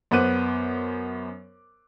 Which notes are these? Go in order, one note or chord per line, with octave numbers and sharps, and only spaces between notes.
F#2 B3 C5 D6 F#6 D#7